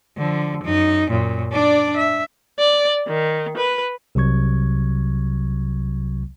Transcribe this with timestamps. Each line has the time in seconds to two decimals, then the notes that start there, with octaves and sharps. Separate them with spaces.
0.18 D3 F3
0.64 F#2 D#4
1.10 F#2 A#2
1.52 D4 D5
1.96 E5
2.59 D5
3.07 D#3
3.57 B4
4.15 C2 C3 F#3 C#6 G#6